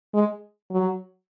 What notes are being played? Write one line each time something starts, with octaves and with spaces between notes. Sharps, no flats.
G#3
F#3